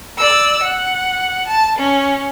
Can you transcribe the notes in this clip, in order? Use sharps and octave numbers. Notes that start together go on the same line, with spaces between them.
D5 E6
F#5
A5
C#4